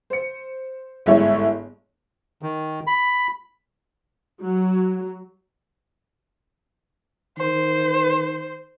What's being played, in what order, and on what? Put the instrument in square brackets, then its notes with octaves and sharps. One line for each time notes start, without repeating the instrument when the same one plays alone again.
[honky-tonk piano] C5 C#7
G1 G#2 A3 E4 C#5
[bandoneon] D#3
B5
[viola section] F#3
[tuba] D#3 [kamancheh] C5